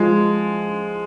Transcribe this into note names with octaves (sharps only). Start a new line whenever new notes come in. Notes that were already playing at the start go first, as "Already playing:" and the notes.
Already playing: F3 G#3